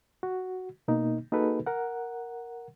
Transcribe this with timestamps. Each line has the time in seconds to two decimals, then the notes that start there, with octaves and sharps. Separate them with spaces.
0.23 F#4
0.88 B2 A#3 D#4
1.32 A#3 D#4 F#4 G#4 A4 B4
1.66 A#4 F#5